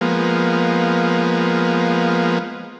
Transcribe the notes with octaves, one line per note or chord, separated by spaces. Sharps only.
F3 G#3 A#3 B3